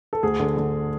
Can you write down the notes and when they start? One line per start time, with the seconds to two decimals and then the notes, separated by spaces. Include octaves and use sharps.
0.13 A4
0.23 D2 G#4
0.40 D3
0.57 D3